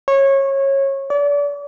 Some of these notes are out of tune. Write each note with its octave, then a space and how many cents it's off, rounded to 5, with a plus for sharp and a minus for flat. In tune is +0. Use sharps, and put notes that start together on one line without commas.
C#5 -20
D5 -35